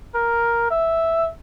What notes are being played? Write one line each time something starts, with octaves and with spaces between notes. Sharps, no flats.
A#4
E5